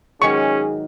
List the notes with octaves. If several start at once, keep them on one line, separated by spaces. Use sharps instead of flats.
G#2 D#3 F#3 C#4 G#4 C#6